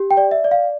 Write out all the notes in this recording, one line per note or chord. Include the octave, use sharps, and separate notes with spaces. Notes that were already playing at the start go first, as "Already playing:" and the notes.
Already playing: G4
G5
D5
E5
D5
F5